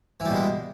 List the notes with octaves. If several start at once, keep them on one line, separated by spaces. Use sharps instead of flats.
B2 E3 G3 G#3